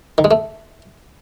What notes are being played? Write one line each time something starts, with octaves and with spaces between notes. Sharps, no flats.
D#3
G#3
A3